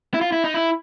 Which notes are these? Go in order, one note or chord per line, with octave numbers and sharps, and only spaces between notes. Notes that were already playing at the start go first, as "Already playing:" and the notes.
E4
F4
E4
D#4
E4